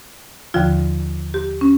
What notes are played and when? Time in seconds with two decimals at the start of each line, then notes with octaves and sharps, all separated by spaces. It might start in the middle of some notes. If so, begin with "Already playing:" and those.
0.54 D#2 D3 F3 F4
1.34 G4
1.61 C#4